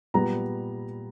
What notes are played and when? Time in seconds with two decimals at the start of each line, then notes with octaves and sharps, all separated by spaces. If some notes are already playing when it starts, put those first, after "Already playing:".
0.14 A#2 G3 B3 A#5